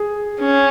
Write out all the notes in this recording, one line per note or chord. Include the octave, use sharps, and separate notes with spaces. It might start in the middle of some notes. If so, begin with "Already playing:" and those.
Already playing: G#4
C#4